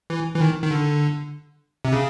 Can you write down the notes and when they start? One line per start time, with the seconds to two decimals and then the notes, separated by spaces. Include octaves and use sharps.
0.10 E3
0.35 E3
0.41 D#3
0.62 D#3
0.71 D3
1.85 C3
1.93 C#3